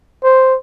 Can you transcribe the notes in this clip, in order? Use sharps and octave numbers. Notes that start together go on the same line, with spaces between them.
C5